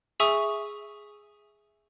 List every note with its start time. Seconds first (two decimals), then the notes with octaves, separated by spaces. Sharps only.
0.20 G#4 E5 G#5 C#6 D#6 E6